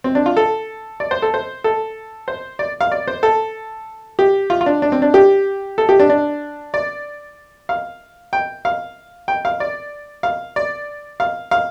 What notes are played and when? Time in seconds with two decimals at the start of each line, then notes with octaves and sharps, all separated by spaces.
0.04 C4
0.15 D4
0.26 F4
0.37 A4
1.00 D5
1.11 C5
1.22 A4
1.34 C5
1.64 A4
2.28 C5
2.59 D5
2.81 F5
2.92 D5
3.08 C5
3.23 A4
4.19 G4
4.50 F4
4.61 F4
4.66 D4
4.82 D4
4.92 C4
5.02 D4
5.14 G4
5.78 A4
5.89 G4
6.00 D4
6.10 D4
6.74 D5
7.69 F5
8.33 G5
8.65 F5
9.28 G5
9.45 F5
9.60 D5
10.23 F5
10.56 D5
11.20 F5
11.51 F5